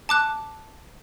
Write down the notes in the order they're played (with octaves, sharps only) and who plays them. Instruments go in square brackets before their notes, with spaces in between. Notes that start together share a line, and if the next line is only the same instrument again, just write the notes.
[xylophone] A5 D6 F#6